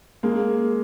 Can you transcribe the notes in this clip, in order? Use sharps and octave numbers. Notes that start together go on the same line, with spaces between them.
G#3 A#3